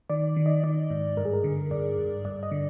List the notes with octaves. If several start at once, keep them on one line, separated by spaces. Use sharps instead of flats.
D#3 D5
D#3
D#5
D#3 D5
G#2
G2 A#4
G#4
A#4
D3
G2 D5
G2
G2 D5
D#5
D3